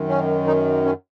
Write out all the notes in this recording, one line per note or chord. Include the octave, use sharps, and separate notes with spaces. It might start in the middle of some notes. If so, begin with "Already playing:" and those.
Already playing: F#2 D#3
C#4
D#4
C#4